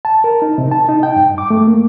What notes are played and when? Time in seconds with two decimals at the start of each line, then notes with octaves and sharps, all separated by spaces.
0.05 A5
0.24 A#4
0.42 D#4
0.58 C3
0.72 A5
0.88 D#4
1.03 G5
1.16 G2
1.38 D6
1.50 A3
1.67 A#3